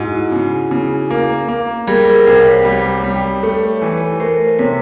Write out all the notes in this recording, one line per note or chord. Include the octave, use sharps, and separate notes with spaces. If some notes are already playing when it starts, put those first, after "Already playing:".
Already playing: G#2 E4 F#4
C#3
C#3
A#3
A#3
G3 G#4 A#4
G#4 A#4
C2 A#4 C5
B4 C#5
G3
G3
A3
E3
A3 A#4 C5
C3 B4 C#5